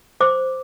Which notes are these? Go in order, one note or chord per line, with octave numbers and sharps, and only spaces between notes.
C5 D6